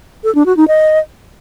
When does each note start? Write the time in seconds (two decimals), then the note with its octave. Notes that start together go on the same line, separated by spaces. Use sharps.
0.24 A4
0.35 D4
0.46 F#4
0.57 D#4
0.68 D#5